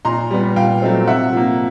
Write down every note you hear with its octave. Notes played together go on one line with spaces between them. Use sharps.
A#2 A#5 C6
G3 B3
A#2 F5 G5
F#3 A3 C4
C3 E5 F#5
F3 A#3